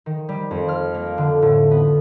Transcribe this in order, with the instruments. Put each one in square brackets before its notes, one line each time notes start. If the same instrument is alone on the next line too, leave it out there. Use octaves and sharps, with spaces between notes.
[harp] D#3
G3
F2
F6
A#3
D3
A2
B3